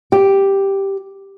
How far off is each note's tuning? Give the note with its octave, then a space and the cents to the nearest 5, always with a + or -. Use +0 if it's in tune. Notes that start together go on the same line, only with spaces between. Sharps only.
G4 +0